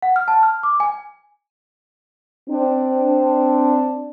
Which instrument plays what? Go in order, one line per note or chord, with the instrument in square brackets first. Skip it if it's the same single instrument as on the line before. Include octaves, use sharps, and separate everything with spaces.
[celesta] F#5
F6
A5
F6
D6
G#5
[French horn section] C4 D4